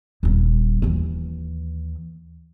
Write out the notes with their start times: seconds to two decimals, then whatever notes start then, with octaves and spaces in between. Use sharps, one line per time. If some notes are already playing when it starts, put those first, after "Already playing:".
0.23 D#1 G3
0.82 D#2 E3